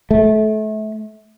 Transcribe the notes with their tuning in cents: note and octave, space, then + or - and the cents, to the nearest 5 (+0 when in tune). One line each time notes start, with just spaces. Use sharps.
A3 -30